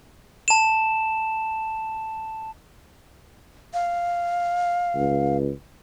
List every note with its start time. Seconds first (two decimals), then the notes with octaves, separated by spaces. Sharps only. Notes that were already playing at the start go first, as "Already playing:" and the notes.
0.48 A5 E7
3.74 F5
4.95 C#2